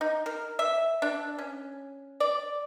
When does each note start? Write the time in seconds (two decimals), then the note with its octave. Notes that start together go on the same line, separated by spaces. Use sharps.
0.01 D#4
0.26 A#4
0.59 E5
1.02 D4
1.39 C#4
2.20 D5